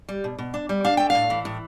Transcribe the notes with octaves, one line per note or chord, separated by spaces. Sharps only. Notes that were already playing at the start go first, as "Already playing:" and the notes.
G3
B2
B2
D4
G3
D4 F5
A3 G5
A2 F5
E3
A2